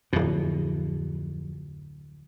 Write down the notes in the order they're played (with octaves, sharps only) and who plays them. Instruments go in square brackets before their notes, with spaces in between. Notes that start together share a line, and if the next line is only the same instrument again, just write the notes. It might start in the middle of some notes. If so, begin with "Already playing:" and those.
[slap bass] D1 B2 [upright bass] F2